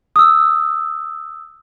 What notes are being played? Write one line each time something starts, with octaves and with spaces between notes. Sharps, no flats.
D#6 E6